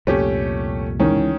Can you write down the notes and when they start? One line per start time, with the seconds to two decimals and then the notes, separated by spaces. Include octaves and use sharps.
0.07 C2 F2 A#2 A3 C#4 G4
1.00 C#2 D#3 E3 C#4